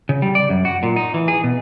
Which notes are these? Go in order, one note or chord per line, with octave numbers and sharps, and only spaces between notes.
C#3
G3
D5
F#2
F#4
A#2
D#4
E3
G#4
B2